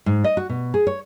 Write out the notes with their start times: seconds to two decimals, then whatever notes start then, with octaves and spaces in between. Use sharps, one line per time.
0.06 G#2
0.24 D#5
0.37 F#4
0.49 B2
0.74 G#4
0.87 C#5